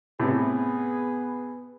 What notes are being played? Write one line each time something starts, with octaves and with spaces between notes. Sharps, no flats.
A2 C3 B3 G#4 B4